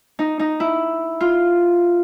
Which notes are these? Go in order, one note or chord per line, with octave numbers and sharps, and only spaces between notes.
D#4
D#4
E4
F4